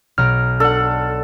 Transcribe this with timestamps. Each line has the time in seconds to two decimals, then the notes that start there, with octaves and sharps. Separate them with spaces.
0.18 B1 A#5 F6 D7
0.60 D4 A4 F#5